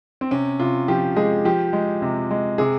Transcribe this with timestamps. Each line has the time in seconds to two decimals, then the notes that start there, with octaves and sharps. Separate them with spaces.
0.21 C4
0.31 C3 C#4
0.59 C3 F4
0.88 F3 G4
1.16 G#3 G#4
1.45 F3 G4
1.73 G#3
2.02 C3
2.31 G#3
2.58 C3 G#4